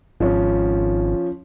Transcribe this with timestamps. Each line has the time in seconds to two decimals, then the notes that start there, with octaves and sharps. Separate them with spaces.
0.20 G#1 F3 C#4